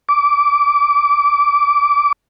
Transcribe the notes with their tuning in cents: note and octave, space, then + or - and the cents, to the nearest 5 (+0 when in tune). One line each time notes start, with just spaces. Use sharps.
D6 -20